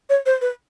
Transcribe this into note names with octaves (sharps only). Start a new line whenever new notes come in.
C#5
C5
B4